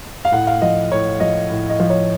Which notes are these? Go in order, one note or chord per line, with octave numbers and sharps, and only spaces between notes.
F5
A2 F#5
F5
F3 D#5
A2 C#5
F3 D#5
A2
D#5
F3
C#5